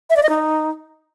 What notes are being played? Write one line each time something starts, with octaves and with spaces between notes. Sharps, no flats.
E5
D5
D#5
D#4